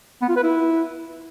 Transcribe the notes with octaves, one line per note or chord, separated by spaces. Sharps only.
B3
F4
B4
E4